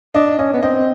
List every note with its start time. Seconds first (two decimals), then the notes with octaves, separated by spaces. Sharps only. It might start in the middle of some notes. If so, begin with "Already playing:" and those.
0.14 D4 D#5
0.39 C#4 D#5
0.54 B3
0.63 C4 D#5